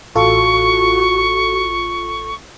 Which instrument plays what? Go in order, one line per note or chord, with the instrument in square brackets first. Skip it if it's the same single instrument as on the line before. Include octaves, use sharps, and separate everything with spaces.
[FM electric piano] A1 F4 A4 [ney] F#4 [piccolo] C#6